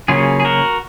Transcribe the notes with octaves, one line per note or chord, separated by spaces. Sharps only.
C#3 F#3 A#3 C#4 F4 G#4
G#4
F#4 A#4